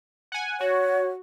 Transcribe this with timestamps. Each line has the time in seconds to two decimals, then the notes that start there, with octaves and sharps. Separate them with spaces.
0.32 F#5 G#5
0.60 F#4 C#5